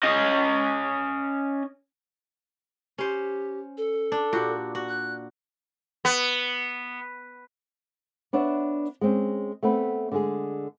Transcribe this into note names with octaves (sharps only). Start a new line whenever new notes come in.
C#4 D#5
C#4 G4 C5
A4
D4
A#2 F#4 G4
F#4
F#6
B3
B3 D4 B4 C#5 D5 E5
G#3 C4 C#4
A3 B3 C4 B4
D3 G#3 G#4